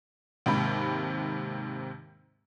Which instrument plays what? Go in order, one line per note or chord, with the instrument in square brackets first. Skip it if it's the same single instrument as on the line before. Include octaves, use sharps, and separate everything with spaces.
[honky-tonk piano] D#2 G#2 C3 B5